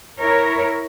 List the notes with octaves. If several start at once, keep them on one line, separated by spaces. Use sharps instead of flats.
E4 A#4 C#5